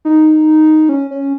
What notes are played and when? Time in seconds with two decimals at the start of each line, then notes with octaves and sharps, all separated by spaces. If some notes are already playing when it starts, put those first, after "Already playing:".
0.05 D#4
0.89 C#4
1.11 C#4